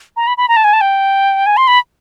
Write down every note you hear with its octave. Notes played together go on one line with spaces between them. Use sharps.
A#5
B5
B5
A#5
A5
G#5
A5
G5
G#5
C6
B5